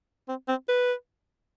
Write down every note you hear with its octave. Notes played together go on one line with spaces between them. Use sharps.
C4
C4
B4